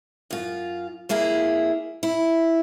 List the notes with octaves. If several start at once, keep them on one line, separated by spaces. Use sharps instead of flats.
F#2 F4
F2 A#3 E4 G#4 A#5
E4